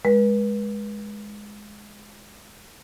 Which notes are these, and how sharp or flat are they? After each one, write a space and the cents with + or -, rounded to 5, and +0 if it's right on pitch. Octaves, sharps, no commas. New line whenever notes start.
G#3 +0 B4 -35